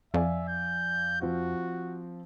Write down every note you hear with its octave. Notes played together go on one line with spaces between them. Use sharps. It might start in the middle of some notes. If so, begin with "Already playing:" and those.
F2 D5 E5 F5 G#5
G6
F3 C4 F4 F#4